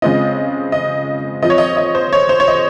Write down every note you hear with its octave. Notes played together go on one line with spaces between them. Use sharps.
C#3 G#3 C4 F4 D#5
D#5
F3 C4 F4 D#5
C#5
D#5
D#5
C5
C#5
C5
C#5
D#5